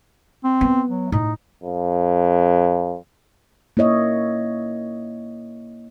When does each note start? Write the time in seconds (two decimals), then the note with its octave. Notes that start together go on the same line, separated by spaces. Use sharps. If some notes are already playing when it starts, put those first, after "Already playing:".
0.44 C4
0.61 B3
0.89 F#3
1.12 A2 D#4
1.63 F2
3.77 A#3 E4 C#5 D#5 E5